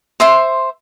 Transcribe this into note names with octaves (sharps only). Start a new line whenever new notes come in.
C5 E5 C6